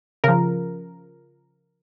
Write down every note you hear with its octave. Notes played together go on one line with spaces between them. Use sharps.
C#3 F3 A#4